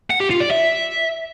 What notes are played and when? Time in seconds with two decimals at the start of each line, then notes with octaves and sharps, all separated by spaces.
0.10 F#5
0.20 G4
0.30 F4
0.40 D5
0.50 E5